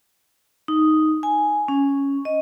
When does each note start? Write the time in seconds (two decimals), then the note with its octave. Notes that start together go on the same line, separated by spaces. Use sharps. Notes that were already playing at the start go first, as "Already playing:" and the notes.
0.68 D#4
1.23 G#5
1.68 C#4
2.25 D#5